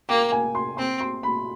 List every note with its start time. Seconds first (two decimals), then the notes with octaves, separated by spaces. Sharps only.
0.09 A#3 G5
0.32 G#5
0.55 C6
0.77 C4 C6
1.00 C6
1.23 B5